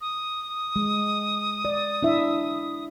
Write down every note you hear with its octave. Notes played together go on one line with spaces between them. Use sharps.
D#6
G#3
D5
D4 E4 E5